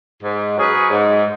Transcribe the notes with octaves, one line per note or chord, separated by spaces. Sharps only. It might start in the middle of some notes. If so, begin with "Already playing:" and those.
G#2
F#3 C#4 G#4 B4
G#2